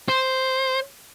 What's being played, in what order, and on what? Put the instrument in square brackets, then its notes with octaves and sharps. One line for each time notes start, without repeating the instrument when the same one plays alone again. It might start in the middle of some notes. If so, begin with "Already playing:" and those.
[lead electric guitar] C5